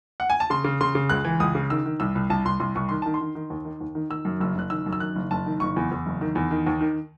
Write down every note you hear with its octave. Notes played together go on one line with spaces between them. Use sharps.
F#5
G#5
A5
C#3 C6
C#3
C#3 C6
C#3
C#2 F#6
E3
C#2 D#6
C#3
D#3 E6
D#3
C2 E6
C2
C2 A5
C2 C6
C2 C6
C2 C#6
D#3 C6
D#3 A5
C6
D#3
D#3
D#2
D#3
D#2
D#3
D#3 E6
F#2
F#1 E6
F#1 F#6
D#3 E6
F#2
E6
D#3 F#6
F#1
F#1 A5
D#3
F#1 C#6
E2
E2
F#1
D#3
E2
D#3
D#2
D#3